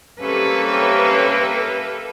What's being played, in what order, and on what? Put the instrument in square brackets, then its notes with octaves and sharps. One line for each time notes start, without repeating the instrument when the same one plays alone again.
[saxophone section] G3 C4 C#4 [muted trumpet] A#3 [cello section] G4 A4 E5 [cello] B4